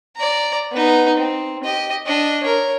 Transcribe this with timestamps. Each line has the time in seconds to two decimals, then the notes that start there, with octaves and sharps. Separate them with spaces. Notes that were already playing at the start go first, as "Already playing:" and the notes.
0.17 D5 A#5
0.72 B3 D#4
1.18 C4
1.63 G4 D#5
2.06 D4 D#5
2.43 A#4 C#5